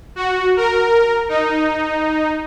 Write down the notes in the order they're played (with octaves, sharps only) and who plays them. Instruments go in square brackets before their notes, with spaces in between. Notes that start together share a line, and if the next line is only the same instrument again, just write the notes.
[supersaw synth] F#4
A#4
D#4